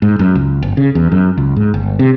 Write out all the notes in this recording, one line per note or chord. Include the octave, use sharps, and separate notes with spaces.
G#2
F#2
C#2
G1
C#3
E2
F#2
C#2
G#2
G1
C3